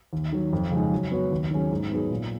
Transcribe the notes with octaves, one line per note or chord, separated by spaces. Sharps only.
D#2
D#3 F#3
F2
C#3 F3 G#3 D#4
F#3
B3 F#4 C#5
D#2
D#3 F#3 C#4 G#4
G#2
F#3 B3 D#4 G#4
A#2